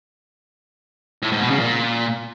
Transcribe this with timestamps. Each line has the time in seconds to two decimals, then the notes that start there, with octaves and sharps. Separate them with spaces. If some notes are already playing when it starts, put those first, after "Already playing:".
1.22 A2
1.32 G#2
1.41 B2
1.50 C#3
1.60 A#2